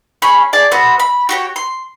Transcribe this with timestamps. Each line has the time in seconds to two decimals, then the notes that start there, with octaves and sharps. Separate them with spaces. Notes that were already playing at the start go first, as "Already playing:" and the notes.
0.22 C#4 G#4 B5 C#6
0.53 G#4 D5 A5
0.71 B3 F#4 A4 C5
1.00 B5
1.29 F#4 G4 C#5
1.56 C6